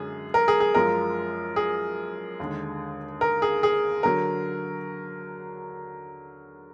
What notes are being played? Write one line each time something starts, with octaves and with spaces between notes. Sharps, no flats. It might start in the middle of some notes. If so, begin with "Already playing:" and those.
Already playing: F#2 D3 G#3 G#4
A#4
G#4
G#4
F#2 F3 G#3 A#4
G#4
D#2 D3 G#3
A#4
G#4
G#4
D3 F#3 A#4